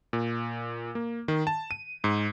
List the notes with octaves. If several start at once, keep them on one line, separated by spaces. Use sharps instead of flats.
A#2
A#3
D#3
A5
D#7
G#2